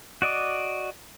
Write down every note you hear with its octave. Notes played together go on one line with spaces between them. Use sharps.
F#4 D5 D#5 D6